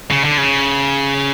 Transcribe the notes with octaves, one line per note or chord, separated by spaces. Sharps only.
C#3
D3
C#3